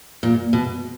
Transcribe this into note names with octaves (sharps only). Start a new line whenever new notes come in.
A#2
B2